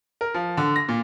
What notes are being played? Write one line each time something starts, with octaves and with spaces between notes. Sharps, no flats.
A#4
F3
D3
A#6
A#2